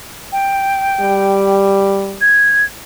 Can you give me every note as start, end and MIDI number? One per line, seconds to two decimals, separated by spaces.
0.32 1.60 79
1.00 2.22 55
2.21 2.65 92